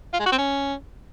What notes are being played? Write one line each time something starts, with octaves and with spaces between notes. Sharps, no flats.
F4
G#3
F#4
C4
C#4